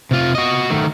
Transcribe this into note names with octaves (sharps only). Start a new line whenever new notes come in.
C3 F4
F#4 D#5
D#3 A3